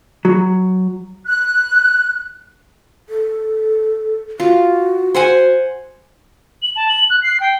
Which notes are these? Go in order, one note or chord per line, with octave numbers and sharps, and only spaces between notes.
F#3
F#6
A4
F4 F#4
C5 F#5 G#5
F#7
A5
F#7
F#6
C7
G5